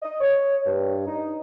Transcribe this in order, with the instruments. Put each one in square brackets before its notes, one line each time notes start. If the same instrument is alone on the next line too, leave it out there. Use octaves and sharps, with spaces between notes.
[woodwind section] D#5
C#5
G2
D#4